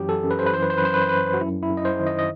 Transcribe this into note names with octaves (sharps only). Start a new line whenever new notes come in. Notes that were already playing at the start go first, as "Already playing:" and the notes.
Already playing: F#2 E3 F#3 G4
A4
F#2
B4
C5
B4
E3 C5
B4
C5
B4
F#2 C5
B4
C5
F#2 B4
F#4
F#2 E4
E4
F#2
D#5
C5
D#3
D#5
D#5